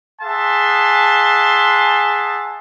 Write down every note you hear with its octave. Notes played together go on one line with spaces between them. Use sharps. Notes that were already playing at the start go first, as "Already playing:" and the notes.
G#4 E5 F#5 A5 C6